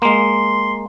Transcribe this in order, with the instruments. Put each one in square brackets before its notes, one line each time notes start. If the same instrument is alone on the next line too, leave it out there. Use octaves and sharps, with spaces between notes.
[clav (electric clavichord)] G#3 A#3 [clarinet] C6